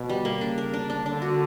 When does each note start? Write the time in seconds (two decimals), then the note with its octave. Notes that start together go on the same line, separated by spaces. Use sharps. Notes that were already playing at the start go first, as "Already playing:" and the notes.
Already playing: B2
0.10 G3
0.25 A#3
0.41 C#3 D4
0.58 A#4
0.74 D4
0.90 D4
1.05 D3 D4
1.22 F#4